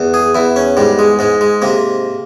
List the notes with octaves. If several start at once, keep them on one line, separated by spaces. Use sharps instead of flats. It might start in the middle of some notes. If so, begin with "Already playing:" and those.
Already playing: E2
G#4
E2 E4
C#4
G#2 G3
G#3
G#2 G#3
G#3
C3 A#3